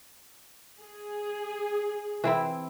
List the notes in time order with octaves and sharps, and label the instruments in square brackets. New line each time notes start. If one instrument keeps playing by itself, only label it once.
[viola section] G#4
[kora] E3 C4 E4